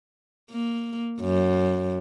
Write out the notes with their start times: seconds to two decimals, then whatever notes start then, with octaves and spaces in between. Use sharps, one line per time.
0.51 A#3
1.21 F#2